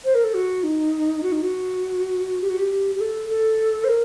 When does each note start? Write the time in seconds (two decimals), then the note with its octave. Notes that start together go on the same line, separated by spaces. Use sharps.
0.05 C5
0.15 A#4
0.24 A4
0.34 F#4
0.64 D#4
1.23 F#4
1.32 D#4
1.42 F#4
2.41 G4
2.49 F#4
2.58 G4
2.95 G4
3.01 A4
3.30 A4
3.84 C5
3.89 A#4